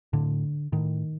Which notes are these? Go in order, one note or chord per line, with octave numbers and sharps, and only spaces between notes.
A2 D3
A2 D#3